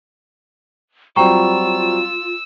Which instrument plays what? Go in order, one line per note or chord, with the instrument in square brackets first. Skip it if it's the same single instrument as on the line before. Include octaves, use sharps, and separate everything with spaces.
[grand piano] F#3 G3 C4 [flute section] F4 [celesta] G5 A#5 C#6 [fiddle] E6